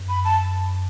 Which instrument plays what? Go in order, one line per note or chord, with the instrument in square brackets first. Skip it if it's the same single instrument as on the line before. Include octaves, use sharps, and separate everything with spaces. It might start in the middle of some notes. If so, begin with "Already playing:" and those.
Already playing: [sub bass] F#2
[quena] B5
A5